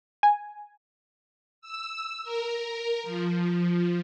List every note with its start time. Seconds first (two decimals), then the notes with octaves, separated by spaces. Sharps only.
0.23 G#5
1.61 E6
2.23 A#4
3.03 F3